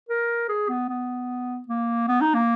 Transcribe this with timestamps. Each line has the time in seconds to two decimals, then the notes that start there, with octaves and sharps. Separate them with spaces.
0.09 A#4
0.49 G#4
0.69 B3
0.89 B3
1.68 A#3
2.08 B3
2.21 D#4
2.35 A#3